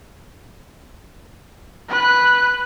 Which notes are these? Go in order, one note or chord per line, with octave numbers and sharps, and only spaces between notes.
B4 F#6